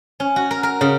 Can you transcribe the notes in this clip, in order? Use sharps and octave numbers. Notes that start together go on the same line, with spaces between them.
C#4
F#4
A#4
A#4
C#3